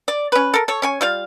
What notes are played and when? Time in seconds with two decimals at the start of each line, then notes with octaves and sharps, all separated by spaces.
0.08 D5
0.32 C#4 B4
0.54 A4 A#4
0.68 A4 C#5
0.82 C#4 C#5 G#5
1.01 G3 F4 F5